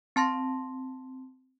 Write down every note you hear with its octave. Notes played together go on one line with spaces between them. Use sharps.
C4 A5 C6 A#6